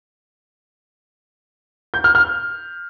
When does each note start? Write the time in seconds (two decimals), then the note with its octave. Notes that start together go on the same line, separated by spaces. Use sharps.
1.94 G6
2.04 F6
2.15 F6